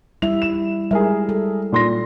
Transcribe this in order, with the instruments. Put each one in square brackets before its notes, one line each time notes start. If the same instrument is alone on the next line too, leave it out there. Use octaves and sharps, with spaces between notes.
[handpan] G3 E4 E5 [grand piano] F7
[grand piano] E7
[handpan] G3 G#3 [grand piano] G#4 A#4 E5
[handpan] A4
[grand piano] A#2 C6 A#6